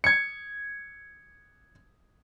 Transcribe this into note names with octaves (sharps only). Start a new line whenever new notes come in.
G#6 C#7